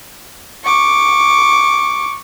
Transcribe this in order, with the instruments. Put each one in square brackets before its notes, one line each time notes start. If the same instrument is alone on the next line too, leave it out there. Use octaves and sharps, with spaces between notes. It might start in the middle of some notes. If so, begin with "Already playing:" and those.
[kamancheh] C#6 D6